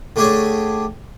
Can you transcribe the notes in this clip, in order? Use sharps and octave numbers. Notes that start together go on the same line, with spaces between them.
D3 A3 D4 G4 G#4 C#5